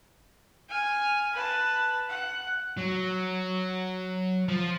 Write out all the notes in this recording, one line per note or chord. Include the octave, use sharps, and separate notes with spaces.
G#5 F6
B4 A5
F#5
F#3
F3